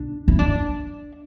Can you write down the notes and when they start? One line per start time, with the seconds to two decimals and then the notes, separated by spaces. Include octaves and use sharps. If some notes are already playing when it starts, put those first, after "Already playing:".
Already playing: D4
0.28 E4
0.39 D4